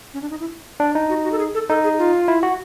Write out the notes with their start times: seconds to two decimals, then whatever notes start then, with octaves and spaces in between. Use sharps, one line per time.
0.14 C#4
0.22 D4
0.30 D#4
0.40 E4
0.80 D4
0.95 D#4
1.09 F#4
1.24 F#4
1.32 A4
1.39 G#4
1.54 A4
1.69 D#4 A4
1.84 G#4
1.98 F4
2.28 E4
2.43 F#4